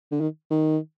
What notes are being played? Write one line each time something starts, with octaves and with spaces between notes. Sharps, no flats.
D3
D#3
D#3